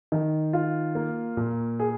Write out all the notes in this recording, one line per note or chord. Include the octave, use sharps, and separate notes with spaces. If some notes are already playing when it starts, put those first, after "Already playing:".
D#3
F4
A#3
A#2
G#4